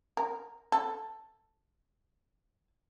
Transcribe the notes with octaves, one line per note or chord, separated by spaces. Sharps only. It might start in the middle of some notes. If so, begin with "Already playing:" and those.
A#4
A4